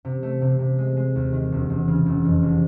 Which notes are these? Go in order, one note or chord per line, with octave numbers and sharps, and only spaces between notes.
C3
A3
C3
C3
G#3
G#3
D#2
D#3
E1
E1
C#3
E1
F2
F1